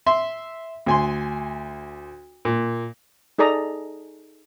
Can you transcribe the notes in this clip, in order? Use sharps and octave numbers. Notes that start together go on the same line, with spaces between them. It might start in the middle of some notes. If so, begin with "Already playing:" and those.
E5 C6
D2 G#5 C6
A#2
D#4 G#4 A4 D5 A#5 D#6